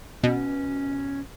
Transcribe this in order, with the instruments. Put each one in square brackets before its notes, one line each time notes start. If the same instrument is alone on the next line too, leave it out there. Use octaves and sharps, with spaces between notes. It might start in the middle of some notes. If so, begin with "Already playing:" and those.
[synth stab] B2 [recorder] C#4